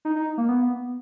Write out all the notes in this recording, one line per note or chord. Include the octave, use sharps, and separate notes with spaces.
D#4
D#4
A#3
B3